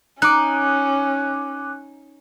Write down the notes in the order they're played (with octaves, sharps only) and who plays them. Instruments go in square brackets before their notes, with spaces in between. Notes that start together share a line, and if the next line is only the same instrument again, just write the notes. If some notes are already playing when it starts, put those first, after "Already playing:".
[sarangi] C#4 [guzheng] D#4 [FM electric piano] D6 F#6